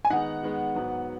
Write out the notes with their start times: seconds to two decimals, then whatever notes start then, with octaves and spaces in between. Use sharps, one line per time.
0.05 G#5
0.10 D#3 G#3 B3 D#4 F#5
0.43 D#3 G#3 B3 D#4
0.75 G#2 F#3 B3